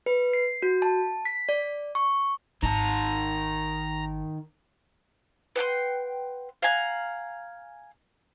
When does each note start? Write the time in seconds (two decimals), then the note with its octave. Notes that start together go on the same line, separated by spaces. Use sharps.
0.06 B4
0.33 C7
0.62 F#4
0.82 A5
1.25 B6
1.49 D5
1.95 C#6
2.63 G#1 D#3 A5 A#5
5.56 B4 F#5 G5 C6
6.62 F5 F#5 G#5 A#5